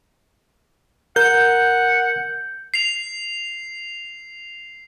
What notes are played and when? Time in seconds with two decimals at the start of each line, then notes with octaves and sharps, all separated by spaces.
1.16 A#4 F#5 G6
2.74 C7 F7